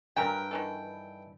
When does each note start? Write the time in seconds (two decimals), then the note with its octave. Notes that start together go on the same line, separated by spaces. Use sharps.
0.17 G2 F#3 A3 A#4 B4 G5 G#5
0.51 D#3 E3 A4